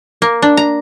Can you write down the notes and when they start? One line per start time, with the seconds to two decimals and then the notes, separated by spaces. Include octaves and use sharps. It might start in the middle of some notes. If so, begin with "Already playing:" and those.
0.22 A#3
0.42 D4
0.57 A#5